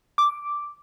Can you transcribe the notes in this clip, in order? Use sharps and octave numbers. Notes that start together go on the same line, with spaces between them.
D6